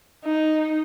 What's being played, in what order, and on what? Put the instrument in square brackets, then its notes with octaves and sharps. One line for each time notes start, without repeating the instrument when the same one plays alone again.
[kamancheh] D#4